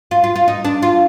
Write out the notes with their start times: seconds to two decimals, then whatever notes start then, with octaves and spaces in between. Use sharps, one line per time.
0.11 F4
0.24 F4
0.35 F4
0.48 D#4
0.65 D4
0.82 F4